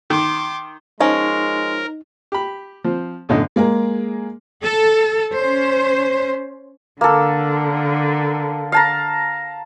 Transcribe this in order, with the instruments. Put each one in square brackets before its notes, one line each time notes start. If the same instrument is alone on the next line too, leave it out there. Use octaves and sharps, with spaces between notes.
[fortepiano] D#3 [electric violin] C6 D6
[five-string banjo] F3 C#4 [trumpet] G#3 [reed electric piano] D#4 [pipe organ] A#4
[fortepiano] G4 B5
F3 C4
B1 F#2 A2 D3 D#5
[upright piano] G#3 A#3 G#4 A#4
[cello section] A4
C#4 C5
[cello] D3 [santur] A#3 A4
[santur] F5 A5 A#5